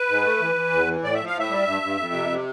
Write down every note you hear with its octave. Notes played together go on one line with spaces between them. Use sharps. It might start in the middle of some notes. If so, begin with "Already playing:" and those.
Already playing: B4
G#2
A3
E3
E3
E2
E3
A2 D5
F3 E5
F5
A2 E5
G3
G2
G2
F2
C3
C3